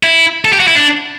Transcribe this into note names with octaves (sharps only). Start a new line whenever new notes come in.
E4
A4
G4
F#4
E4
D4